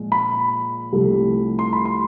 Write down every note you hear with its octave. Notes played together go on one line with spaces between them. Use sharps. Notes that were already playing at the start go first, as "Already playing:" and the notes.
Already playing: A#2 F3 G#3
B5
C2 C3 F3 A3
C6
B5
C6